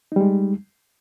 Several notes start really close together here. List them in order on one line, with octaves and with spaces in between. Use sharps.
D#4 G3 G#3